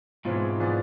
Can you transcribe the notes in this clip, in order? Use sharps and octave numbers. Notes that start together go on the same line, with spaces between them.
G#2 B2 E3 G#3 C4 F4
E3 B3 F4 G#4 D5